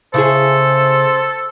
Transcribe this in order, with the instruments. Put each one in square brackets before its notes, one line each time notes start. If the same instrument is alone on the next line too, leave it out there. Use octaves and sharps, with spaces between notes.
[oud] C#3 E4 G#4 [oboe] A4 [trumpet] C5